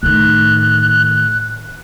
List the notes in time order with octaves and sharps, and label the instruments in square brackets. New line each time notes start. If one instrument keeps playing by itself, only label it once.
[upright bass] A2 D#3 [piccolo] F#6